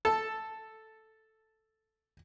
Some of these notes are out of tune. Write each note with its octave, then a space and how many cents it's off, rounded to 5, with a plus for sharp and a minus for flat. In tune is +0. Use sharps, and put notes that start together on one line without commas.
A4 +0 A5 +0